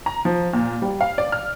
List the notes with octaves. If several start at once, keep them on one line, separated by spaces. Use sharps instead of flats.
A#5
F3
A#2
G3
F5
D5
F6